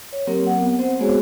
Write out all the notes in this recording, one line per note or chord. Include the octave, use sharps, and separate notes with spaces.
C#5
F#3 A#3 C4 G4 A#4
F#5
B3
C4 C5
G#3 A#3 B3 F#4 G#4 C#5